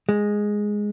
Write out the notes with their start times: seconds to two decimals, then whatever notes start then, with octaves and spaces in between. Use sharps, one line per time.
0.09 G#3